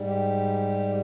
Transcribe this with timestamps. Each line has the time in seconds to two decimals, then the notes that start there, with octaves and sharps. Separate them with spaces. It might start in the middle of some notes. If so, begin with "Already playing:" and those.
Already playing: G#2 G3
0.08 G4